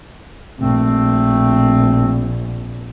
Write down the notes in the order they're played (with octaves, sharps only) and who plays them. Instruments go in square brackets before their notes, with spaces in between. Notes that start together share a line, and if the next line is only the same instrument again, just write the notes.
[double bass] A#1 [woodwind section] A3 C4